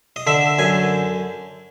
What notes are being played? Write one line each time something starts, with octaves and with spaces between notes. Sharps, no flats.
D#5
D3 E5
F#2 G#5